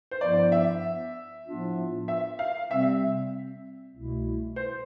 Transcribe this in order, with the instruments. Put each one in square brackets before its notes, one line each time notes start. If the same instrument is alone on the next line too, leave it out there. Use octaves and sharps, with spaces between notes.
[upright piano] C5
[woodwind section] G2 F3 B3 E4 [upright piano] D5
[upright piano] E5
[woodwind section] A2 F3 B3 D4 F4
[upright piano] E5
F5
[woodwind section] C3 G3 C4 [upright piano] E5
[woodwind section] C2 B2 A3 E4
[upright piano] C5